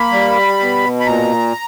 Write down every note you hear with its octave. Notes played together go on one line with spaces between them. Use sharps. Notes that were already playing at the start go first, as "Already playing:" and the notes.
Already playing: A#3 B5
G3
B2
B5
A#2 A#5